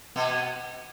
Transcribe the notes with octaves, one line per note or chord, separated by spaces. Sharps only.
B2 B3